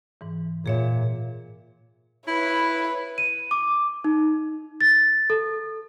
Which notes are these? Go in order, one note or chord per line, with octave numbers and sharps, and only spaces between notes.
G#2 E3
A#2 G#4 C#5 E5
E4 B4 C#5
D#7
D6
D#4
A6
A4